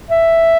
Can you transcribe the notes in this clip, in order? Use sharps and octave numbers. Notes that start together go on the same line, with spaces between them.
E5